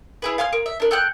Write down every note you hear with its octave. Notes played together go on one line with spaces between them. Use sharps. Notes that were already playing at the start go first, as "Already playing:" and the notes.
E4 G#4 B4
F5 G#5 C6 F6
A#4
E5
D4 A#4
A4 G5 F#6